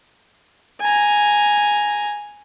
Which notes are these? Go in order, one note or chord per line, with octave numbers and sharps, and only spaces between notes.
G#5 A#5